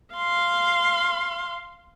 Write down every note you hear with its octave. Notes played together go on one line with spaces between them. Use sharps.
F5 C6